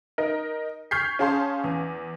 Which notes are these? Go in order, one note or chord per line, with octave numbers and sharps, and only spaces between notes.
D#4 A#4
C#6 F6 G6 G#6 B6 C7
C#4 G#4 F5 A5 C6
E2